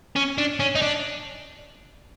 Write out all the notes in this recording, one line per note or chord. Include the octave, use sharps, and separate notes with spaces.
C#4
D4
C#4
D#4
D4